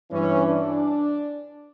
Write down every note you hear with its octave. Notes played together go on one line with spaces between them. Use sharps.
G2 E3 C#4
D4